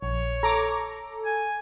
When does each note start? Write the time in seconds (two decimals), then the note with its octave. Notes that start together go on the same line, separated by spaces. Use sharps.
0.02 A#1 C#5
0.43 A4 A#5 D6
1.25 G#5